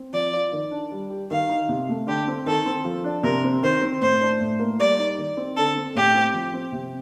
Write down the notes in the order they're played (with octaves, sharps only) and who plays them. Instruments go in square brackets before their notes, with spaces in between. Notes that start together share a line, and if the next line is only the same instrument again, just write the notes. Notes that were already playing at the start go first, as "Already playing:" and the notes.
Already playing: [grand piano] C4
[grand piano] F3 [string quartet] D5
[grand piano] F4
D#3
D4
G3
G4
[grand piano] D#3 [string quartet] F5
[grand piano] D#4
C3
A3
[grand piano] D3 [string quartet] G4
[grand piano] C4
[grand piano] D#3 [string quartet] A4
[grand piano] C4
F3
D4
[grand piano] C3 [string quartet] A#4
[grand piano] C4
[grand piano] D#3 [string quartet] C5
[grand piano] C4
[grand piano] A2 [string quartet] C5
[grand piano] D4
A2
A#3
[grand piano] G3 [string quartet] D5
[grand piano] D#4
D#3
C4
[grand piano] D3 [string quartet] A4
[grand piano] C4
[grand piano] A2 [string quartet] G4
[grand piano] C4
F3
C4
C3